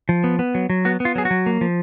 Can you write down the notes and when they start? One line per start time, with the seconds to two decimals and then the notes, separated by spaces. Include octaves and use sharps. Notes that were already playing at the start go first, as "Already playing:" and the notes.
0.09 F3
0.24 B3
0.39 B3
0.55 F#3
0.70 F#3
0.85 B3 F#4
1.00 B3
1.05 F4
1.15 F#3 G#4
1.25 F#4
1.31 F#3
1.46 A#3
1.61 F3